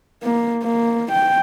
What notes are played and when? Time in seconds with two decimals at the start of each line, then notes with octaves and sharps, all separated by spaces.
0.23 A#3
0.64 A#3
1.12 G5